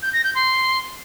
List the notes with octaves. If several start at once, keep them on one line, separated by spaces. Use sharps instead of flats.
G6
A#6
G6
C6